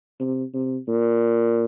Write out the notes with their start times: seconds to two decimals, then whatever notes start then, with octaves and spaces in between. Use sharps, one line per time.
0.20 C3
0.53 C3
0.88 A#2